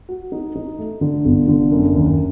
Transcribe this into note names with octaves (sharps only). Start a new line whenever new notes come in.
F#4
D#4
D#4
A3
D3
G1
D3
F#2
D#2